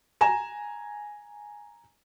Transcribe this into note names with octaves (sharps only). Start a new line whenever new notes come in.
G#5 A#5 E7